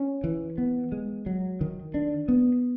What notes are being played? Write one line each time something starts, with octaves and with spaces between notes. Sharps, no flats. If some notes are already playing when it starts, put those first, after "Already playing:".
Already playing: C#4
E3
B3
G#3
F#3
D#3
D4
B3